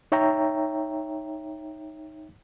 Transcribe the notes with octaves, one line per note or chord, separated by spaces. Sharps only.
D#4 C#5 E5 G5 A#5